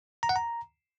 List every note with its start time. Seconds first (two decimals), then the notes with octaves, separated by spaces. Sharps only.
0.23 A#5
0.29 F#5
0.36 A#5